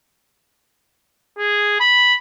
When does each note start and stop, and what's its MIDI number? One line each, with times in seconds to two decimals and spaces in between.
1.38 1.77 68
1.80 2.15 83